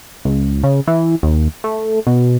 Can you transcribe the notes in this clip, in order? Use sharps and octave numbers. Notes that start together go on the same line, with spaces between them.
C#2
C#3
E3
D#2
A3
B2